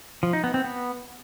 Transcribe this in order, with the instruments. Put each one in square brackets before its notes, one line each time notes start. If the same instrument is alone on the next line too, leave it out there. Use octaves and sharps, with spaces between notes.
[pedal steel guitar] F3
D#4
B3
C4
B3